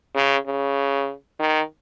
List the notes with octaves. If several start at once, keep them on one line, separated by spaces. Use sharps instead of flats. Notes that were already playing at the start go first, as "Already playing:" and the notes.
C#3
C#3
D#3